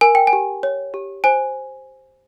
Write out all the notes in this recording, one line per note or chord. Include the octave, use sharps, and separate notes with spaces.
A#4 G#5
G5
G#5
G4
C#5
G4
C5 G#5